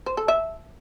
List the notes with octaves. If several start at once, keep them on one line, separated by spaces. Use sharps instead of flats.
C5
A4
E5